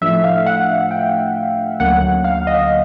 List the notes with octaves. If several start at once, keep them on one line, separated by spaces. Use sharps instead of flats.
A2 F3 A3 D4 E5
F5
F#5
G5
D2 D3 F#3 A#3 C#4 F#5
F5
D#5